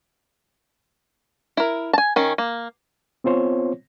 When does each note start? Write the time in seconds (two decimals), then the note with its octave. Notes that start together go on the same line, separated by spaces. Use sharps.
1.57 E4 A#4
1.93 G#5 A5
2.16 D#3 C#4
2.38 A#3
3.24 B3 C4 F4 C5 C#5